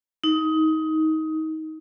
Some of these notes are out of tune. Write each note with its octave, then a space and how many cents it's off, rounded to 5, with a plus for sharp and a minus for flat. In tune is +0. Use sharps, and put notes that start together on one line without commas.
D#4 +20